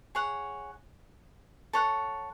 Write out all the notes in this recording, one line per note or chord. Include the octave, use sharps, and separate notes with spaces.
G#4 C#5 F#5
A4 C#5 F#5